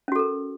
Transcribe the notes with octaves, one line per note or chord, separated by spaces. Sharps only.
C#4 F#4 A4 A#4